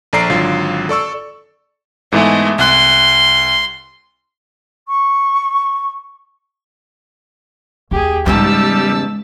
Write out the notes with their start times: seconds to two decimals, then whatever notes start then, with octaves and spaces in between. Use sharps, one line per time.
0.13 A#1 A4 D5 A#5 C7 D7
0.30 G#1 D3 F#3 F4
0.89 A4 D5 C#6 E6
2.12 G#2 E3 G#3 A3 B3
2.59 C2 C6 F#6
4.87 C#6
7.91 D#2 G4 G#4
8.26 E2 G#2 C#3 G3 G#3 B3 A5 E6